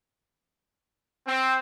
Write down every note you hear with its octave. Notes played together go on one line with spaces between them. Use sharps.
C4